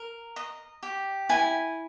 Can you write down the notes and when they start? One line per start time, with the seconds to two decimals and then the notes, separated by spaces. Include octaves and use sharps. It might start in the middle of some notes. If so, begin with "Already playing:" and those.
Already playing: A#4 A#5
0.36 D#5
0.83 G4
1.29 E4 G#5